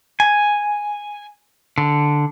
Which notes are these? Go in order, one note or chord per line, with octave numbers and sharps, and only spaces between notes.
G#5
D3